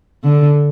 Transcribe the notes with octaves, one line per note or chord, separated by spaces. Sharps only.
D3